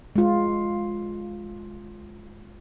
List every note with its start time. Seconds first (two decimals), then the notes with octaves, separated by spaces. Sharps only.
0.16 G#3 F4